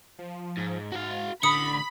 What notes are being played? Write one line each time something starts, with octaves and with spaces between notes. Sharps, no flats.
F3
G#2
G#2 F#4 F5
A1 D3 B5 D#6 C#7